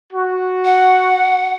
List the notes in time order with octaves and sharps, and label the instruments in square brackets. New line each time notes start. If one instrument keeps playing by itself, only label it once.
[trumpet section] F#4
[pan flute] F#5